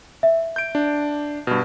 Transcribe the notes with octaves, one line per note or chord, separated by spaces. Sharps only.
E5
G6 D7
D4
G2 B2